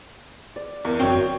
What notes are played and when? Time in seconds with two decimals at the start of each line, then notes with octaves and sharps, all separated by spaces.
0.56 D5
0.85 E2 A#4
0.99 G1 F#2 C4 F#4 C#5 G5